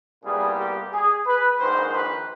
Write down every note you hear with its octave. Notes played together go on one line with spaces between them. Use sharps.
C2 A#2 G3 B3 G#4
G4
G#4
B4
A#1 G#2 D#3 C5
B4